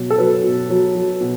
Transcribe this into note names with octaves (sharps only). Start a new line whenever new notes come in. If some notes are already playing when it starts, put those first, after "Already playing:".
Already playing: B2 F#3
A4
F#3 B4
B2
F#3
F#3
B2